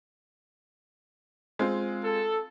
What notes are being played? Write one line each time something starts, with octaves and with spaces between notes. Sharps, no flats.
G#3 C4 F4
A4